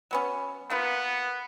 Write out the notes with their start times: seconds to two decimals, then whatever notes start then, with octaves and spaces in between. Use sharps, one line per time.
0.11 F#3 B3 C#4
0.70 A#3 B3 F4 B4